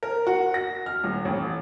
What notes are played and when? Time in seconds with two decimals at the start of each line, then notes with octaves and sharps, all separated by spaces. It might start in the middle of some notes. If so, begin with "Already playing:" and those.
0.03 A#4
0.27 F#4
0.54 A#6
0.86 F6
1.04 D#1
1.25 A1